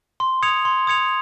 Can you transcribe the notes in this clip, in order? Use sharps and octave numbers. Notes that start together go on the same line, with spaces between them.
C6
D#6 G#6 C#7 F7
C6
D#6 G#6 C#7 F7